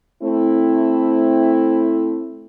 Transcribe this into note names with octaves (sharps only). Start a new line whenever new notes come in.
A3 C4 E4